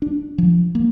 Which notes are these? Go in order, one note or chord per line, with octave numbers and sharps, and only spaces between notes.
D4
F3
A#3